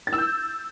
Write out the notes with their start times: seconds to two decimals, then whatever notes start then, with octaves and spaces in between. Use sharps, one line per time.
0.07 A6
0.13 E6
0.18 G6